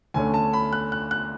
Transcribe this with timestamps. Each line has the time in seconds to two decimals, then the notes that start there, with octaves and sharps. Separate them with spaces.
0.14 D2 D3 A3 C#4 G#5
0.34 A5
0.53 B5
0.73 F#6
0.92 F#6
1.11 F#6